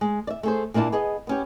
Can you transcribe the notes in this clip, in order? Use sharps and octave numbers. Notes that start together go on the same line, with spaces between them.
G#3
D5 E5
A3 G#4 C5
A#2 A#3 D4 E4 A5
B3 G#4 D#5
B3 C#4 G4